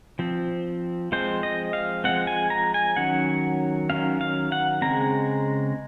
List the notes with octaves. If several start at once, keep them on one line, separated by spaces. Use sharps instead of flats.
F3 C4
F3 G#3 C4 C5
D#5
F5
F3 G#3 C4 F#5
G#5
A#5
G#5
D#3 F#3 C#4 F#5
D#3 F#3 C#4 F5
F5
F#5
C#3 G#3 C4 A#5